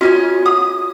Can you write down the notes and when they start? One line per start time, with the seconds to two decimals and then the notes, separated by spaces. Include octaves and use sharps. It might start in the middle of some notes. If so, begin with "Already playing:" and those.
0.01 C#4 F4 F#4 D#5 G#5
0.46 D#6